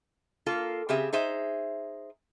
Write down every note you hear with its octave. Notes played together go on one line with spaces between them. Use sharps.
A#3 F4 A4
C#3 C4 G4 G#4 E5
D#4 G#4 C5 E5